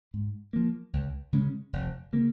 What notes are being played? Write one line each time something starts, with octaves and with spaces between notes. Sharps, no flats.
G#2
F3 A#3
C#2
C#3 G#3 C#4
F1
C#3 A#3